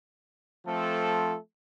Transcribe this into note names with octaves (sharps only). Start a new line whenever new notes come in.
F3 A3 C4 A4